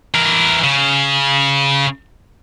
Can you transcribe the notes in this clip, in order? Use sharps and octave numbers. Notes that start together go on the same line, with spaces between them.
E3 A#4
C#3